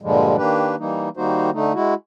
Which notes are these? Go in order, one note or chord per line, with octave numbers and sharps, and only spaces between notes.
G2 A#2 D3 F3 G3 G#3
D#3 A#3 D4 G4 B4
E3 G3 A#3 D#4
D#3 G3 A#3 D#4 F#4 C5
D3 A3 D#4
G#3 E4 F#4